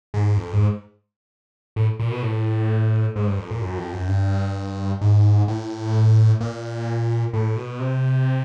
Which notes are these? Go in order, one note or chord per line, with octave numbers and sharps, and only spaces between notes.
G#2
F2
G#2
A2
A#2
B2
A2
G#2
G2
F2
A#2
F#2
F2
F#2
G2
G#2
A2
A#2
A2
B2
C3